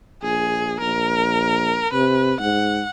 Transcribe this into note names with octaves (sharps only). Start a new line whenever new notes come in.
A#1 G#4
A#1 A#4
C3 B4
G#2 F#5